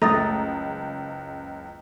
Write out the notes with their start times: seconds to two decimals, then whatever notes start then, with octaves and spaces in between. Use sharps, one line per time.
0.02 F#1 C#2 A3 A4 A#5 D#6 A6 A#6